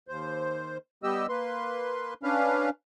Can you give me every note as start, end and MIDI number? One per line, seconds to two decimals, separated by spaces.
0.08 0.78 39
0.08 0.78 72
1.03 1.27 55
1.03 1.27 59
1.03 1.27 67
1.03 1.27 75
1.03 1.27 88
1.29 2.14 58
1.29 2.14 71
1.29 2.14 84
2.23 2.70 61
2.23 2.70 62
2.23 2.70 71
2.23 2.70 77